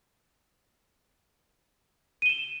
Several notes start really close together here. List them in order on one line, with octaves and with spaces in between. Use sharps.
D#7 G7 E7